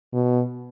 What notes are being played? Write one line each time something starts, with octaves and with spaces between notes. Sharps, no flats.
B2